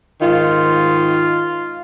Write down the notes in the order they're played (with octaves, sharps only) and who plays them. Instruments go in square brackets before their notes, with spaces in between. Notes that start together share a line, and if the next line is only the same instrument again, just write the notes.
[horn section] G#2 D#3 F4